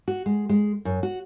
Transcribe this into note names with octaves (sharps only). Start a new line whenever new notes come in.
F#4
G#3
G#3
F#2
F#4